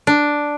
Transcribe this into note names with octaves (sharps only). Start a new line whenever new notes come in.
D4